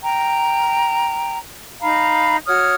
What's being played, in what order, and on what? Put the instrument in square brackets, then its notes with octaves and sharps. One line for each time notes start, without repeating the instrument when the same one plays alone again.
[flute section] G5 A#5
D#4 F5 A#5 B5
F#4 C#5 D#6 F6